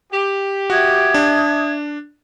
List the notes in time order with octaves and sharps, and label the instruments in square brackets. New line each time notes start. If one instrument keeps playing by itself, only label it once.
[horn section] G4
[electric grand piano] F#4 [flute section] E5 D#6 G#6
[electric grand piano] D4